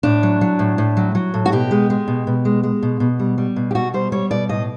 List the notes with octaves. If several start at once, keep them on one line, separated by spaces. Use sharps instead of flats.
A2 D4
F#3
F#3
A2
A2
F#3
F#3
A2
F#4
B2 G4
G#3
G#3
B2
B2
G#3
G#3
B2
B2
G3
G3
B2
G4
B2 F#4
G3 C5
G3 C#5
B2 D5
A2 D#5